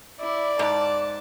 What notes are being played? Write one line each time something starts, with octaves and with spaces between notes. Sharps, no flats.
E4 D5 D6
G#2 A5